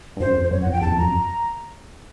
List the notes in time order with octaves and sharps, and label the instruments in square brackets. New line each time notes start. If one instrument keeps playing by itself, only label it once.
[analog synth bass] G2
[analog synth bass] F#2 [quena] C5
[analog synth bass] F2
[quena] C5
[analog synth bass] F#2 [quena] C#5
[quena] F#5
[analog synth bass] F2
[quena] G5
[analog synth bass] E2 [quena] A5
[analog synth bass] F2
[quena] A#5
[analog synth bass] F#2